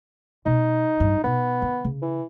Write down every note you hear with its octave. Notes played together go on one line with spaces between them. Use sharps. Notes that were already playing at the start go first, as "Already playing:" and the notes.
B2 C4 D#4
A1 G2
B2 B3 D#4
D#3
C#3
E3